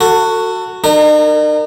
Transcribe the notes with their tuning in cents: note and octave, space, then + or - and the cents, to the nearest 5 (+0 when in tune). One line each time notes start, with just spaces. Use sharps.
F#4 +0 A4 +30
D#4 -45 A#4 -20